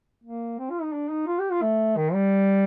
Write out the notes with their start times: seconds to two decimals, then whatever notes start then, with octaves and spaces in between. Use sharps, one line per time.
0.24 A#3
0.59 C4
0.70 F4
0.82 D#4
0.93 D4
1.11 D#4
1.27 F4
1.39 G4
1.51 F4
1.62 A3
1.97 D#3
2.14 G3